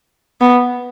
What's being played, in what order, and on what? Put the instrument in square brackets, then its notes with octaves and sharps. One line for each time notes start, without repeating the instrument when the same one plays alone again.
[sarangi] B3